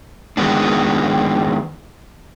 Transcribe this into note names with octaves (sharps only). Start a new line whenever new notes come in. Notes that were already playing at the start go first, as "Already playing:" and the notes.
D#3 F3 G#3 B3 D4